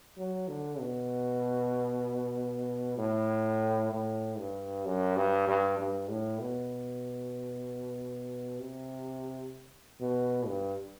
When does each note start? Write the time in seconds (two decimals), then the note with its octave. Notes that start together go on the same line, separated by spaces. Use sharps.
0.18 F#3
0.48 D3
0.79 B2
2.98 A2
3.92 A2
4.39 G2
4.85 F#2
5.16 G2
5.47 G2
5.79 G2
6.10 A2
6.41 B2
8.59 C3
10.00 B2
10.47 G2